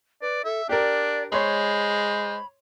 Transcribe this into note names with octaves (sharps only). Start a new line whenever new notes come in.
B4 D5
A4 E5
D4 G4 A#4 D5
G#3 C5 C#5 B5 C6